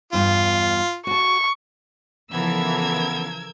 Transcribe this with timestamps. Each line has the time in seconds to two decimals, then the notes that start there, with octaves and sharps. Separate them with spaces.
0.13 E2 G2 F4
1.07 F#4 A5 C#6
2.33 C#3 E3 F3 B3 A4 A#4 E6 G#6